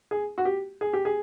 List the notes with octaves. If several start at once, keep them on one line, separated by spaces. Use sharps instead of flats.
G#4
F#4
G4
G#4
G4
G#4